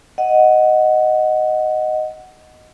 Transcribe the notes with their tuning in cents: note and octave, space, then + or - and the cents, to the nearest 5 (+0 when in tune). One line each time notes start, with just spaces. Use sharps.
D#5 +0 F#5 +0